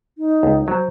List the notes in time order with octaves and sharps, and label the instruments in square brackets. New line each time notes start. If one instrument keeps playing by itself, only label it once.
[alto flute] D#4
[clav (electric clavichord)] C#2
[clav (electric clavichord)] F#3 [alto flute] C5